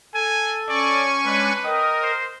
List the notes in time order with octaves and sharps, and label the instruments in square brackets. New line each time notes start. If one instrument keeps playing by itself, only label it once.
[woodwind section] A4 [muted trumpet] G#5
[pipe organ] C#4 G#5 C#6 [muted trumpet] D5
[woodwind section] G#3 D4 [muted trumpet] B4
[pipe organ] A#4 [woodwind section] D#5 G5 D#6
[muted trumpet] C5